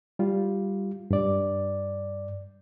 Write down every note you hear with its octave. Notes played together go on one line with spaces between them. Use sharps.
G3 F4
G2 D5